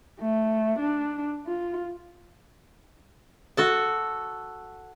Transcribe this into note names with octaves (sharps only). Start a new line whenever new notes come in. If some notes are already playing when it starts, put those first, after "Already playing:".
A3
D4
F4
F#4 A4 A5